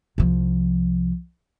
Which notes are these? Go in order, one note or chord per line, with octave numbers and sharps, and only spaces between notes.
C2 F3